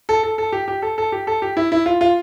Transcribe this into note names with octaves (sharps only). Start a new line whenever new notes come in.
A4
A4
A4
G4
G4
A4
A4
G4
A4
G4
E4
E4
F4
F4